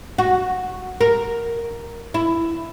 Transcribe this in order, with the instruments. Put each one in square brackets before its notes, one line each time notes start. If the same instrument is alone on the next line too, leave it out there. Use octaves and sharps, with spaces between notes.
[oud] F#4
A#4
E4